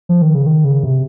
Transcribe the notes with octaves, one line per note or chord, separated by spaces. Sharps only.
F3
D#3
C#3
D#3
C#3
C3